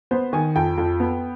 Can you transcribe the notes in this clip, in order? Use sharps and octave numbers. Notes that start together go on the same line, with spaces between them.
B3 C5
D#3 G#5
F2 G5
F2
B3